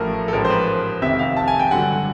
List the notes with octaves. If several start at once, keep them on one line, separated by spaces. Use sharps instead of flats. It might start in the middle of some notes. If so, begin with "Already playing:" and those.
Already playing: A1 A2 F3 A3 A4 A#4
A4
A1 G#2 F3 A#4
C5
B4
F1 F2 C3 D#3 E5
F5
A5
G#5
G5
G2 D3 F#3 F#5